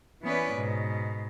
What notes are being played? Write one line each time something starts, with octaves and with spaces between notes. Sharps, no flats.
E3 B3 C#4 B4 D5
G#2 B2